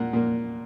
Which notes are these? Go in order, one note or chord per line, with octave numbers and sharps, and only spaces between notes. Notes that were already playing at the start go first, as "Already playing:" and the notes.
Already playing: A#2 A#3 F#5
A#2 A#3